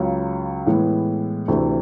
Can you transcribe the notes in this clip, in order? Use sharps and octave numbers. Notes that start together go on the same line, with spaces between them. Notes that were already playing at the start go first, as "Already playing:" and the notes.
Already playing: C#2 C#3 F#3
A2 E3 G#3 B3
D2 C3 E3 A3 D4